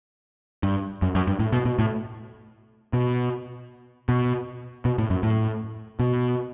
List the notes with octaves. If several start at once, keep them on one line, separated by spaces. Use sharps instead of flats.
G2
F#2
F#2
G2
A2
B2
B2
A2
B2
B2
B2
A2
F#2
A2
B2